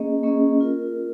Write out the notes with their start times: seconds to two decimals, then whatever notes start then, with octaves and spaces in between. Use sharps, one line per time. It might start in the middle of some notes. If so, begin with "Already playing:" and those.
Already playing: A#3 C#4 G#4 D#5
0.23 A#3 C#4 G#4 D#5
0.61 F4 A#4